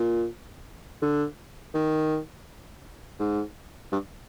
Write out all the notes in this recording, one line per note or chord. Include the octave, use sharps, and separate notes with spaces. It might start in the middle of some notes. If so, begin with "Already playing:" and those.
Already playing: A#2
D3
D#3
G#2
G2